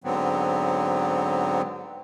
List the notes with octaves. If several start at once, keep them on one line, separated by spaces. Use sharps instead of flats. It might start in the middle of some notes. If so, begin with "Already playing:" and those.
G#2 D3 F#3 B3 C4